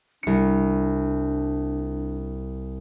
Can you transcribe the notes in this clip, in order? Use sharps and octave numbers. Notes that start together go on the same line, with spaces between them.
C2 D4 C#7